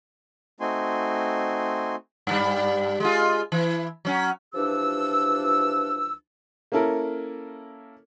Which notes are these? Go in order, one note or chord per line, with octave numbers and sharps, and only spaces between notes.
A3 C4 D#4 F#4 G#5 C6
G2 G3
G#3 F4
E3 E4
F#3 C#4
C#2 E3 F3 D4 G4 E6
A#3 C#4 E4 A4 A#4